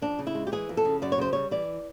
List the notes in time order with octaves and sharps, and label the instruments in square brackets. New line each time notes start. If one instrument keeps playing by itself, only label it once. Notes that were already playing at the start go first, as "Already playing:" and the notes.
[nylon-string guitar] F2 D4
C#3
E4
G#3
G4
E3 G#4
F2
A4
C#3
F#2 D5
C#5
C#3 C5
G3 C#5
E3 D5